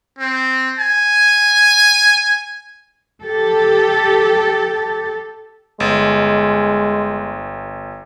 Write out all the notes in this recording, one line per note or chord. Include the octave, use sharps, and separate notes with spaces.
C4
G#5
G4 A4
G1 G#3